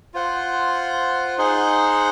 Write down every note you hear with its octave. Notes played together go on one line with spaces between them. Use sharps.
F4 C5 F#5
D#4 G#4 C5 F#5